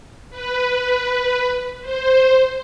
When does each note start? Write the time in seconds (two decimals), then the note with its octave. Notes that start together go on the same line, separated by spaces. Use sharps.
0.30 B4
1.81 C5